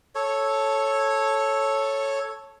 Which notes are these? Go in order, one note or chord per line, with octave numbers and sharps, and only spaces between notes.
A4 C#5